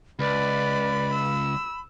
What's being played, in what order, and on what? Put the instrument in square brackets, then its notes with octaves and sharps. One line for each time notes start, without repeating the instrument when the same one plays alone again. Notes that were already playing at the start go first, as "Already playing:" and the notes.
[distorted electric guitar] C#2 [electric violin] B4 D5 [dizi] B5
[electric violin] E6